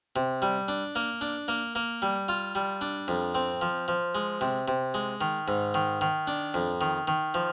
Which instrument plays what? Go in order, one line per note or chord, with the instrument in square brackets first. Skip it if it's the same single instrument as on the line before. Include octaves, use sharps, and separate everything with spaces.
[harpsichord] C3
G3
D4
A#3
D4
A#3
A#3
G3
F4
G3
D4
F2
C4
F3
F3
G#3
C3
C3
G#3
D#3
G#2
D#3
D#3
D4
F2
D#3
D#3
F3